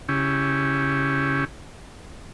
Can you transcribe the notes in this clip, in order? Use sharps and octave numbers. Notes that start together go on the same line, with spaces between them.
C#3 C#4 E4 G4